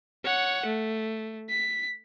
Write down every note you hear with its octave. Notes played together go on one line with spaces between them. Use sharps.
C#5 F#5
A3
B6